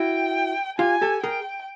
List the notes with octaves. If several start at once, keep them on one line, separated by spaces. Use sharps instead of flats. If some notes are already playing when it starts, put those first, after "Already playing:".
Already playing: E4 F#4 G5
F4 G4 G#5
G4 A4
G#4 A#4 G5